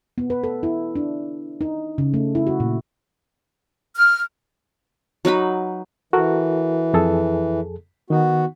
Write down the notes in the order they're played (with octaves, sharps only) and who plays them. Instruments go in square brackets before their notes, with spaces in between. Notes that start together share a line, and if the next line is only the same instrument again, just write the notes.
[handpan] B3
B4
A4
E4
D4
D#4
C#3
A3
E4
F#4
A#2
[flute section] F6
[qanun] F#3 D#4 B4 B5
[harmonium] E3 [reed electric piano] F#4 A4 A#4
[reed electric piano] F2 G#4 A4
[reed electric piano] D#3 D#4 [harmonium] B3 F#4